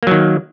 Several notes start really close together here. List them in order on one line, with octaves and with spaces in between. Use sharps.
A#3 F#3 D#3